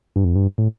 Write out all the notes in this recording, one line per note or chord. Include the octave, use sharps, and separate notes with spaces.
G2
F2
G2
A2